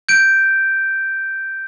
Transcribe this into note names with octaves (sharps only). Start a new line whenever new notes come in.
G6 D7